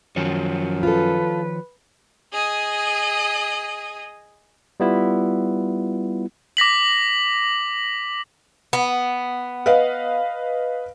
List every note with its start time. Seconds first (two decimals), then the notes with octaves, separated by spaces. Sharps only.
0.16 F#2 D#3 F3 C#5
0.83 F4 A4 B4
2.33 G#4 D#5
4.80 G3 B3 E4 F4
6.57 D6 A#6 B6 F#7
8.73 B3
9.66 B4 D#5 F5